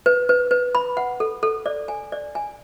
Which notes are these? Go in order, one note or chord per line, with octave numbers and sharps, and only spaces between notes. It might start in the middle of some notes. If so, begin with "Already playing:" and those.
B4
B4
B4
B5
F#5
A4
A4
D5
G#5
D5
G#5